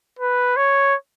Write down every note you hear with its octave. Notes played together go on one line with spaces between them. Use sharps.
B4
C#5